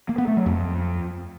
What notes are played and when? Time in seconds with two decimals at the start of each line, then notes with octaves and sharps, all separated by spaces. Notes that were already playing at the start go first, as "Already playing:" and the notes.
0.09 A#3
0.18 B3
0.28 A3
0.37 F#3
0.46 F2